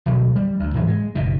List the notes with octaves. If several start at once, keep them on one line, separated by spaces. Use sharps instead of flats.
D1 B2 F#3
G3
D2
G#2 E3 F#3 A#3
G#3
F#1 B2 D#3